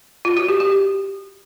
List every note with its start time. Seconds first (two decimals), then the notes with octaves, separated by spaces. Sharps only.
0.25 F4
0.37 F#4
0.48 G4
0.60 G4